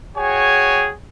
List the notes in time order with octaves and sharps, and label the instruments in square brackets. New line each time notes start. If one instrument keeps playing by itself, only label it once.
[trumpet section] F#4 G#4 C#5 G5 G#5